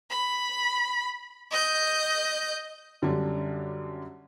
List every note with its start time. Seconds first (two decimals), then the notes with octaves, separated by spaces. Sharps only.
0.10 B5
1.51 D#5 G6
3.02 F#2 D3 G3 C#4 D4